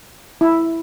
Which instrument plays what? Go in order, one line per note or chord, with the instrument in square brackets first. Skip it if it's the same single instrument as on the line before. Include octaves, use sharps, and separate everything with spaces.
[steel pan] E4